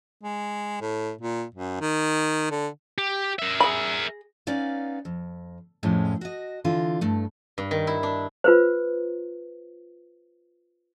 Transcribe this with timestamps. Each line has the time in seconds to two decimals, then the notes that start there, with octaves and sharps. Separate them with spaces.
0.23 G#3
0.81 A2
1.21 A#2
1.55 F#2
1.80 D#3
2.51 D3
2.98 G4
3.39 A#4 E5
3.60 G#4 B5
4.47 B3 C#4 D#4 D5 F5
5.05 F2
5.83 F2 A2 G#3 C#4
6.21 F#4 D#5
6.64 D3 E3 F4
7.01 G2 A3
7.58 G2
7.71 D#3
7.87 E4
8.03 D4
8.44 F4 B4 C5